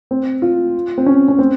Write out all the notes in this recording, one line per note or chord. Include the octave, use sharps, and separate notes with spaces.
C4
F4
C4
C#4
C#4
C4